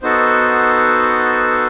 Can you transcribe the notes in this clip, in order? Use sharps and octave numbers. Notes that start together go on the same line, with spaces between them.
B3 D#4 F#4 A4 C5